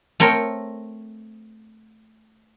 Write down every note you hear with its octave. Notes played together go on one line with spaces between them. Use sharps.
A3 C4 A#4 C#5